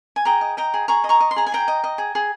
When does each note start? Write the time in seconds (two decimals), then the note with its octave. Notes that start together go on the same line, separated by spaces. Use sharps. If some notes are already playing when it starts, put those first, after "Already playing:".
0.16 G#5
0.25 G#4 G5 A#5
0.41 D#5
0.57 D#5 G5 A#5
0.74 G#4
0.88 G#4 A#5 C#6
1.04 D#5
1.09 A#5 C#6
1.21 D#5
1.31 C6
1.36 G#4 A#5
1.47 G#5
1.52 G#4 G5 A#5
1.68 D#5
1.84 D#5
1.98 G#4
2.15 G#4